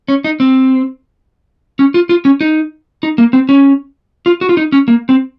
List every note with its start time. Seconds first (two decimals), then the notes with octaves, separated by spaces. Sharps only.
0.08 C#4
0.24 D#4
0.40 C4
1.79 C#4
1.94 F4
2.09 F4
2.25 C#4
2.41 D#4
3.03 D#4
3.18 A#3
3.33 C4
3.49 C#4
4.26 F4
4.41 F#4
4.49 F4
4.57 D#4
4.72 C#4
4.88 A#3
5.09 C4